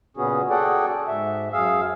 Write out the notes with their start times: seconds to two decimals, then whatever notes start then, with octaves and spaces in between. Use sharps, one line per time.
0.17 A#2 C#3 B3 C#4 F#4 G#4
0.50 F#4 G#4 A4 D5 F#5 G5
1.07 G#2 E5
1.53 F#2 G#4 F5 E6